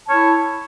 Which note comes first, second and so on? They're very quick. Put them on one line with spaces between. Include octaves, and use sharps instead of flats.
A5 C#5 E4